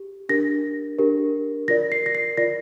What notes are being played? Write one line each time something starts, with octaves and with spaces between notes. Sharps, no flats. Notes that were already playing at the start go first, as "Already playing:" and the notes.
Already playing: G4
D4 G4 A#4 A#6
D4 G4 A#4
F4 A#4 D5 A#6
C7
A#6
C7
F4 A#4 D5 A#6